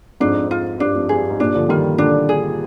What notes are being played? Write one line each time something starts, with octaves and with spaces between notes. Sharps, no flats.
F2 G#2 D4
F4
G2 D4
F2
G2 G#4
G#2
G2 A#2 D4
D3 F3
D#3 G3 F4
A#2 D3 D4
G#4